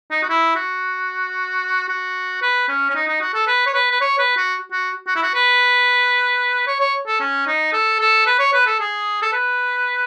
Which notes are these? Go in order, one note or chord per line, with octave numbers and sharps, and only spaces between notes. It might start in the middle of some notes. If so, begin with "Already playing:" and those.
D#4
F#4
E4
F#4
F#4
B4
C#4
C#4
D#4
D#4
F#4
A4
B4
C#5
B4
B4
C#5
B4
F#4
F#4
F#4
E4
F#4
B4
C#5
C#5
A4
C#4
D#4
A4
A4
B4
C#5
B4
A4
G#4
A4
B4